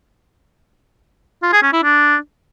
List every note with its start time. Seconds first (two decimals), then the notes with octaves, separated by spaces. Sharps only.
1.43 F4
1.53 G#4
1.63 C#4
1.73 E4
1.83 D4